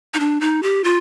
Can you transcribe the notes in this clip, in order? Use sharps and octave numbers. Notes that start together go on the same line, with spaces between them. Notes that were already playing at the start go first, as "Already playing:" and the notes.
D#4
D4
D#4
G4
F4